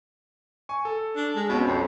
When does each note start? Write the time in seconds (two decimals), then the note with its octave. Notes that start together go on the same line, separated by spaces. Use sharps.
0.69 G#5 C#6
0.85 A4
1.16 D4
1.36 G#3
1.49 B1 B2 C4 C#4
1.67 F2